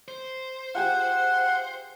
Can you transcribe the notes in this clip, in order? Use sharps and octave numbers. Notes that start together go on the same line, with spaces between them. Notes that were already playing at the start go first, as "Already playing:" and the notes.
C5
F4 G4 G#4 F#5